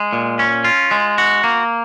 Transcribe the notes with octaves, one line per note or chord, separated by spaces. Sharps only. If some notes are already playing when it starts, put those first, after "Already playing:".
Already playing: G#3
A#2
C#4
F4
G#3
F#4
A#3